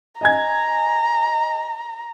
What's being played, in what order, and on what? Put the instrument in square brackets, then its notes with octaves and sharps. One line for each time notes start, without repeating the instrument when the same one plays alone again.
[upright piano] D#5 G#5 G#6 [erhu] A#5